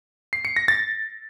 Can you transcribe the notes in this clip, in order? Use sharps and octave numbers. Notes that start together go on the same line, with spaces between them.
C7
C#7
A#6
A6